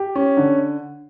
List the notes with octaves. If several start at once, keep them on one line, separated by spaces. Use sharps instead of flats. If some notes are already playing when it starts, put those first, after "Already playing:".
Already playing: G4
C#4
D3